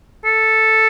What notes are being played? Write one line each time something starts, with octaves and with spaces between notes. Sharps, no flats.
A4